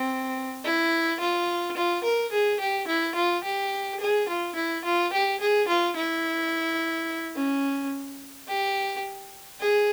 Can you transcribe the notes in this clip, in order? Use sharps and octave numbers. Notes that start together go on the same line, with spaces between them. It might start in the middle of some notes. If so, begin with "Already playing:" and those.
Already playing: C4
E4
F4
F4
A#4
G#4
G4
E4
F4
G4
G#4
F4
E4
F4
G4
G#4
F4
E4
C#4
G4
G#4